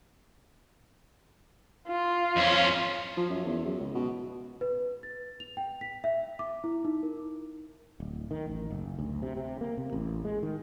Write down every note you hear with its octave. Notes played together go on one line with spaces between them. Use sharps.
F4
F2 C#4
F3
F#2
E2
F#2
C#2
B2
B4
A6
F7
G5
B6
E5
D6
E4
D#4
A#4
D1
D#3
A1
F#1
D2
C3
C3
A#3
C3
A1
G#3
D#3